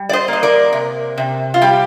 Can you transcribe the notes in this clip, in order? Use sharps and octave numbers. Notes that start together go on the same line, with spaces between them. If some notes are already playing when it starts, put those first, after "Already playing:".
Already playing: G3
D5
C5 D#5
A#3 D#5
A#4 D5
C3
C3
F4
G3 G4